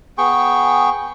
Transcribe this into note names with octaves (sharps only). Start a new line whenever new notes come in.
B3 G#4 G5 C#6